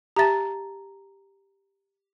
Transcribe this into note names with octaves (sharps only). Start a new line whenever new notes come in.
G4 E5 A5 A#5 A6